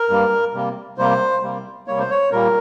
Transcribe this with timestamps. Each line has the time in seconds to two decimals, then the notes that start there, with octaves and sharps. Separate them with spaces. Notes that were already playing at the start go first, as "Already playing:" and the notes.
Already playing: A#4
0.09 G2 G3 A#3
0.54 C3 G3 A#3
0.98 C3 G3 A#3 C5
1.43 C3 G3 A#3
1.87 C3 G3 A#3 C#5
1.99 C5
2.10 C#5
2.32 A#2 G3 A#3 A#4